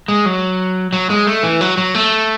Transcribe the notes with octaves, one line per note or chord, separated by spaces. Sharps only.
G#3
F#3
F#3
G#3
A3
E3
F#3
F#3
A3